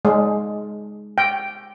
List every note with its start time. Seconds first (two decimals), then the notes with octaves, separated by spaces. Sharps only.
0.05 G#3
1.18 G5